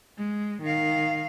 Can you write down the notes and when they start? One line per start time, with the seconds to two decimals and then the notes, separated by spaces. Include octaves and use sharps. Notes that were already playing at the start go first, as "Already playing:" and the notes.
0.18 G#3
0.62 D#3 F5